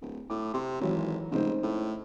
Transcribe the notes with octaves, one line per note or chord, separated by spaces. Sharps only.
D1
A2 D6
C3 C6
G#1 E3 F#3 C#5
F1 G#2 C#3 C5
A2